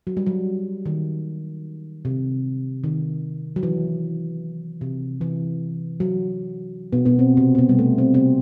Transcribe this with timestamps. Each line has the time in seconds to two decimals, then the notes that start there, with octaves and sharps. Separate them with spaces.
0.07 F#3
0.17 G3
0.26 F#3
0.86 D#3
2.05 C3
2.84 D#3
3.56 F#3
3.63 E3
4.81 C3
5.21 E3
6.00 F#3
6.92 B2 B3
7.05 B2 B3
7.19 C4
7.37 C3 C4
7.55 C4
7.58 B2 B3
7.69 G3
7.79 A3
7.98 C4
8.14 C3 C4